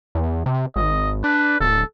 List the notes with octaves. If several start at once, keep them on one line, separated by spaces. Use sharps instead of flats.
E2
C3
G#1 D#5
D4 B4
D1 A4